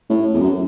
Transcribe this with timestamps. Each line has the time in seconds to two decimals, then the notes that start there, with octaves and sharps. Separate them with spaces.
0.10 A2
0.34 E2
0.40 F#2